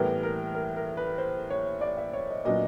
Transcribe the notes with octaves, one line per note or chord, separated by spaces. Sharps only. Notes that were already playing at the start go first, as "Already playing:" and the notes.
Already playing: A2 E3 G3 B3 A#4
A#4
A#4
A#4
B4
C5
C#5
D5
E5
C#5
D#5
A#2 F#3 B3 D4 D#5